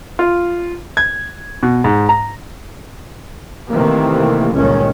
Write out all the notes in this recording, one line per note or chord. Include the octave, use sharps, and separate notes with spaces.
F4
G#6
B2
G#2
A#5
C3 D#3 E3 A3 A#3
G1 C#2 A#2 D#3 C#4